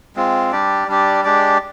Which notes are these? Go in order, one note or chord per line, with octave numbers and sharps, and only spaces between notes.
G#3 C4 F4
G3 D4 G4 D5
G3 D4 G4 D5
G#3 D4 G4 D5